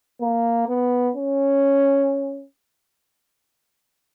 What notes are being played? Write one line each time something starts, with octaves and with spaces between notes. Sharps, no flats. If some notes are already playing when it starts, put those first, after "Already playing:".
A#3
B3
C#4